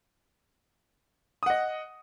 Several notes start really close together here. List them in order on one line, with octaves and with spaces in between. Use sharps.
D#6 F#5 D#5